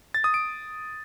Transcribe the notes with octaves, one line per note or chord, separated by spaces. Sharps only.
A6
D#6
D7